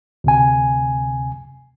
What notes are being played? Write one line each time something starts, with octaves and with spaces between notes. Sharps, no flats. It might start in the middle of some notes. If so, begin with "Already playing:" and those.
D2 C3 G#5